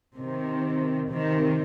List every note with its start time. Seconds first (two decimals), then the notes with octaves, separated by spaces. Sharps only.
0.15 C3 D#3
1.10 C3 D#3